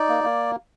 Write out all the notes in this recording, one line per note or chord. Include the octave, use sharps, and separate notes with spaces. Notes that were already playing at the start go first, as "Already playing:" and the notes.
Already playing: D#4 D5
A#3
A#3